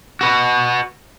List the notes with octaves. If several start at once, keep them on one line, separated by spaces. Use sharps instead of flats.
F#4 B4